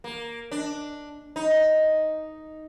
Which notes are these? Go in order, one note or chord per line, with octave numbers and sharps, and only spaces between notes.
A#3
D4
D#4